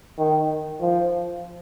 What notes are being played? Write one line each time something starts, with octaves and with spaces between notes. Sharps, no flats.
D#3
F3